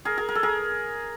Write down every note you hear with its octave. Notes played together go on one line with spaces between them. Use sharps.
G#4 A#4
G#4 A#4
A#4
A4
G#4 A#4